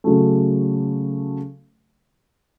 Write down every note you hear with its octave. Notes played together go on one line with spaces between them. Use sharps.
C#3 F#3 A3